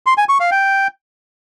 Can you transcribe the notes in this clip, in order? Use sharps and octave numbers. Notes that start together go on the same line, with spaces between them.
C6
G#5
C#6
F5
G5